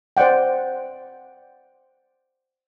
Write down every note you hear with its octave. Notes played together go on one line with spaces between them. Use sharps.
C5 D5 D#5 F#5 G5